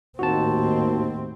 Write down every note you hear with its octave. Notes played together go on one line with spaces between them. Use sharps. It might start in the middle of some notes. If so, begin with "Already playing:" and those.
D#2 A2 C4 F#4 A5